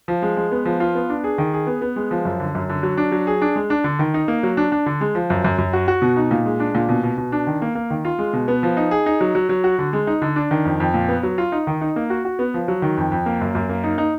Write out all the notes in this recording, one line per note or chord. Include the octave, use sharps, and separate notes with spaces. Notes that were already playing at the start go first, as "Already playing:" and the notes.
F3
G#3
G#3
B3
F3
F4
B3
D4
G#4
D#3
G#4
B3
B3
G#3
F3
F#2
D3
F#2
D3
F#3
D4
F#3
G#4
D4
G#3
D4
D3
D#3
D#4
A#3
F#3
D4
D4
D3
G#3
F3
F#2
F#2
F#2
F#4
F#4
B2
D#4
A#2
G#3
D4
A#2
B2
B2
B2
D4
D#3
A#3
A#3
D#3
F4
G#3
B2
B3
F3
D#4
G#4
D#4
F#3
F#3
F#3
F#4
D3
G#3
D#4
D3
D4
D#3
F2
F2
A#2
B3
F#3
F4
D#4
D#3
D#4
A#3
F#4
F#4
B3
F3
F#3
D#3
F2
F2
A#3
F#2
F#2
A#3
D#4
D#4